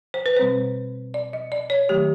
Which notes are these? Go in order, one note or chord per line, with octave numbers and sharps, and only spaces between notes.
C5
B4
B2 G3 C4 C5
D5
D#5
D5
C#5
D#3 F#3 A3 G4